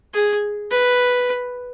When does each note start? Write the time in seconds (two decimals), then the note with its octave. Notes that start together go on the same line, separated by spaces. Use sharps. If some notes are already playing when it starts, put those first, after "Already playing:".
0.14 G#4
0.71 B4